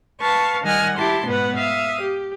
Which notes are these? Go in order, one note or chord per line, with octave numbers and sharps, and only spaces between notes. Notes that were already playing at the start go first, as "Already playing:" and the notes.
B4 F5 A5 C#6
D#3 G3 D#5 F#5 G#5 F6
E4 G4 A5 C6
G#2 B2 B3 B4 F#5
E5 F5 D#6
G4